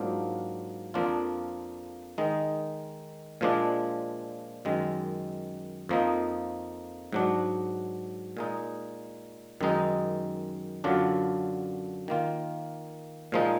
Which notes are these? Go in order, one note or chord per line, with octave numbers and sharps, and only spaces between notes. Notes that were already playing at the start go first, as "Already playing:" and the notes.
Already playing: G#2 F#3 A#3 D4 F4
F2 F3 A#3 D4 F4
D#3 G#3 D#4
A#2 F3 G#3 D4
F#2 D#3 G#3
F2 F3 A#3 D#4
G#2 F#3 D4
A#2 G#3 D#4
F#2 D#3 G#3 D#4
F#2 D3 F#3 D4 F4
D#3 A#3 F4
A#2 F3 G#3 D#4